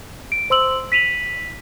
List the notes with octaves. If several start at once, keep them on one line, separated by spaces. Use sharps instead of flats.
D7
C5 C6 E6 F#7
B6 D#7 F7 F#7